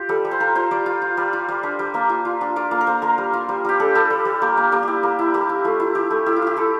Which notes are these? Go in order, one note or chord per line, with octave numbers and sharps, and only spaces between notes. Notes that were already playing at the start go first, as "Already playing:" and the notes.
Already playing: F4 G4
G3 A4
G3
C5
F4 A#4
F4 C5
G3 D5
F4
F4
G3
F4
G3
D4 E5
G3
A#3 E5
F4
F4
D4
F4 D5
A#3
A#4
A#3 C5
A#3 A#4
G3
F4
G3
G3 G4
D4 A4
G3 A4
G3
G3
A#3 G4
A#3
A#3 G4
E4 G4
A#3
E4
A#3 G4
E4
A3 F4
E4
E4 G4
A3
E4 G4
F4
E4 G4
E4 A4